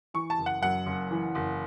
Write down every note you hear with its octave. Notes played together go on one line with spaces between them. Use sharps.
E3 C#6
A5
F#1
F#5
F#2 F#5
F#1
E3
F#1